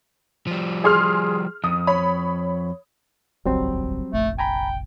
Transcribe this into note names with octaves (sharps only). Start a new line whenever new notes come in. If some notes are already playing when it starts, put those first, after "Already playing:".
F3 G3
G#4 C6 F6
F2 D#6
C#5 B5
D#1 G#1 C#2 F#3 G3 C4
F1 A#1 A3
G5 G#5 A#5 B5